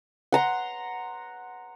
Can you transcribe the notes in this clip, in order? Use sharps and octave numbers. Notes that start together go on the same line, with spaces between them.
F#5 A#5 C6